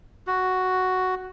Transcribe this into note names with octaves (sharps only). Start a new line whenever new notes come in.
F#4